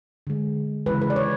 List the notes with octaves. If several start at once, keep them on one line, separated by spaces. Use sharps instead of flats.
D3 G#3
C#3 E3 G#3 B4
B4
D5
C#5